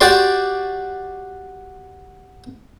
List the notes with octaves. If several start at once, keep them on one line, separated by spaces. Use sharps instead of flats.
F#4 G4 D5 C6